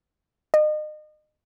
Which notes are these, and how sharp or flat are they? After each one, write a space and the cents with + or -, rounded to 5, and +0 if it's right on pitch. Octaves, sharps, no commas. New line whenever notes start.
D#5 -35